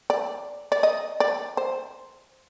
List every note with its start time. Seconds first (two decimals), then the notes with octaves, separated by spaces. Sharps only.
0.10 D5
0.72 D5
0.83 D#5
1.20 D5
1.57 C5